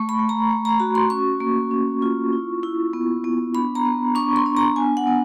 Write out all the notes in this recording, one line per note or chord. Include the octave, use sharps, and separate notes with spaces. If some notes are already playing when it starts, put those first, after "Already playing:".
Already playing: A3 C#6
B5
A3
A#5
A3
A#5
F#4 B5
C6
C#4 C#6
A#3
C#4
F4
E4
E4
B3
B3
D4 B5
A#5
B3
D4 C#6
C6
D4
A#5
B3 G#5
F#5
B3